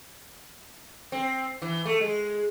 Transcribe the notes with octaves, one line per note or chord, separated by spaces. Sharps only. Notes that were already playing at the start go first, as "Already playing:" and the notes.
C4
E3
A3
G#3